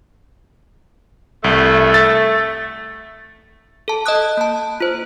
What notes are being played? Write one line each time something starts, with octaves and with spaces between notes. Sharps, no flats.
C2 A3
A6
A4 A5
D#5 A5 D#6 F#6
A#3 A5
F4 C5